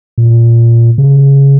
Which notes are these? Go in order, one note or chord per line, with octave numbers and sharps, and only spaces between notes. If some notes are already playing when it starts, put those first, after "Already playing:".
A#2
C#3